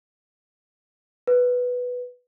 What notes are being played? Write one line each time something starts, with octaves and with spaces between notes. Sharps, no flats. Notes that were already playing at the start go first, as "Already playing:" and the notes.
B4